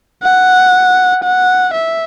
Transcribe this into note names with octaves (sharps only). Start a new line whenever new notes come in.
F#5
F#5
E5